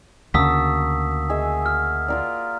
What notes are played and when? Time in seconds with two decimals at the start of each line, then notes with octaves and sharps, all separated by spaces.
0.34 D2 C#3 A#3 F#4 A5 D#6 E6 B6
1.29 G#4 D#5 E5
1.66 F6
2.08 F4 A#4 D5